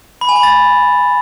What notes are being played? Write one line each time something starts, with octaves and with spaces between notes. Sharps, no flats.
B5
G#5
B5
A6